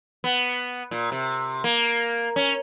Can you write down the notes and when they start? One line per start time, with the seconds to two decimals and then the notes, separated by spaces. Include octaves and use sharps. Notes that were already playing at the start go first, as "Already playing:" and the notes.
0.24 B3
0.91 A#2
1.12 C3
1.64 A#3
2.36 C#4